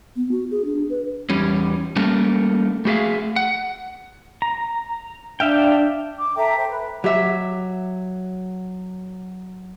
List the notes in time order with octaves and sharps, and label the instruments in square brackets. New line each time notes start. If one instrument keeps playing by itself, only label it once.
[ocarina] B3
F#4
G#4
D4
B4
[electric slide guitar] E2 G3 C#4
G3 A3 A#3 C#4 A5
A3 F#4 G#4 E5 F5
F#5
[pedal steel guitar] A#5
[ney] D4 [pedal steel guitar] E5 F5 G5
[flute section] D6
A4 E5 G5 A#5
C5
B4
[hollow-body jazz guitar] F#3 [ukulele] G4 E5